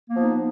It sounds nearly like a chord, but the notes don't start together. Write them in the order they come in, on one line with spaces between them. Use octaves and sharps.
A#3 B3 F3 D#4